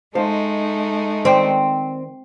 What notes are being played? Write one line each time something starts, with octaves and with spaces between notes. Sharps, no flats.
G#3 A3 D#4 C5 F5 A5
D#3 C4 D5 G5